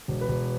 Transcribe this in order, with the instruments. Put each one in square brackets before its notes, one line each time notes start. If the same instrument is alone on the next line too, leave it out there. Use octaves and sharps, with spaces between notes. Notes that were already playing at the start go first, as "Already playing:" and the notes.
[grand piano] E1
B4
E1